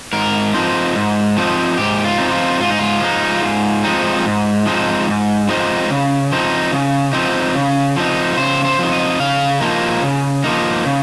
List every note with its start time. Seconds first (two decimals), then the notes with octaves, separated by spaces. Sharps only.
0.13 G#2 A#4
0.54 F3 C4 D#4
0.95 G#2
1.37 F3 C4 D#4
1.77 G#2 G4
2.04 F4
2.18 F3 C4 D#4
2.32 F4
2.60 G#2 F4
2.70 D#4
2.79 F4
3.01 F3 G#3 C4 D#4
3.42 G#2
3.84 F3 G#3 C4 D#4
4.25 G#2
4.66 F3 G#3 C4 D#4
5.07 G#2
5.49 F3 G#3 C4 D#4
5.90 C#3
6.32 F3 C4 D#4
6.72 C#3
7.13 F3 C4 D#4
7.55 C#3
7.96 F3 C4 D#4
8.37 C#3 C5
8.65 C5
8.79 F3 C4 D#4
8.93 D#5
9.20 C#3 F5
9.60 F3 A#3 D#4
10.02 C#3
10.44 F3 A#3 D#4
10.85 C#3